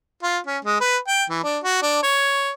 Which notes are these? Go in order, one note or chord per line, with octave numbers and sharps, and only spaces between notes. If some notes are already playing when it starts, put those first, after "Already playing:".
F4
C#4
G#3
B4
G5
E3
D4
F#4
D4
C#5